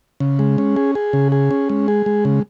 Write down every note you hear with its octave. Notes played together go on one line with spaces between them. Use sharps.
C#3
G#3
C#4
G#4
G#4
C#3
G#4
C#4
G#3
G#4
G#3
C#3